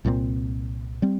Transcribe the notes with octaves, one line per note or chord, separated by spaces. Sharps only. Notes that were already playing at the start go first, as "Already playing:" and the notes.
C2 A#2 G3 C4
G3 C4